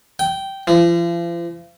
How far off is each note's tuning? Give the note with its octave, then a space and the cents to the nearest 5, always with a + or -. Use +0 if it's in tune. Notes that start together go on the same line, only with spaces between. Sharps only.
G5 -10
F3 -40